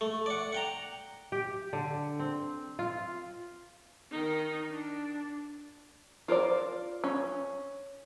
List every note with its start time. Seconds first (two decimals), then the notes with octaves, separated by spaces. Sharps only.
0.01 A3
0.26 D5 F#5
0.52 F#5 G5 A#5
1.32 G4
1.73 D3
2.19 C4
2.79 F4
4.11 D#3 D#4
4.71 D4
6.28 F4 A#4 C5 D5
7.04 C#4